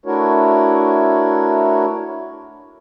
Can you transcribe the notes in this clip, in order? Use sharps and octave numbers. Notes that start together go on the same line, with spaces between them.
A3 D4 E4 F#4 A#4 C#5